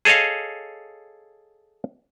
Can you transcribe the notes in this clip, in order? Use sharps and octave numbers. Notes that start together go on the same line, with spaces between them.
G#4 A4 C#5 D#5 F5